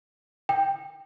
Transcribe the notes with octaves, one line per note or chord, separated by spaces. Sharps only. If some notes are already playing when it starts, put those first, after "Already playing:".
G5